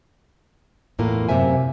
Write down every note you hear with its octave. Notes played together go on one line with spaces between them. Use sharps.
E2 A2 A#3 F4
F#2 C3 A#3 C5 E5 G#5